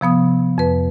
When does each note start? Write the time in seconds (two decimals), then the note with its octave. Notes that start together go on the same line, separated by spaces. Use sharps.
0.01 C3 F3 B3 D#6
0.58 F2 B4